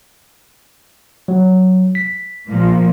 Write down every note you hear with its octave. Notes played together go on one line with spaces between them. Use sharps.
F#3
B6
A#2 F3 A#3